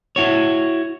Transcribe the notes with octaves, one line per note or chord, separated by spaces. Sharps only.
E4 F#4 C#5